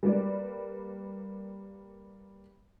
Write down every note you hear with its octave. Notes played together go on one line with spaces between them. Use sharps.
G3 A#3 B4 D5